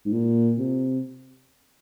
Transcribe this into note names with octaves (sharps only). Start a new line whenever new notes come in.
G#2
A#2
C3